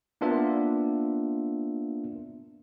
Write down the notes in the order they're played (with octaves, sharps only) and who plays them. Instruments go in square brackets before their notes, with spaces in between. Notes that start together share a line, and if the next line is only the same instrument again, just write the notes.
[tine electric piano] A#3 B3 D4 F4 A#4 E5